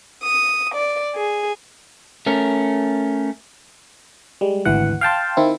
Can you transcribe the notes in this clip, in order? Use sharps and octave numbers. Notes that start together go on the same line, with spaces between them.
D#6
D5
G#4
A3 C#4 A#4
G3 G#3
G#1 D2 E3 F#5
F5 G5 A5 C6
D#3 C4 E4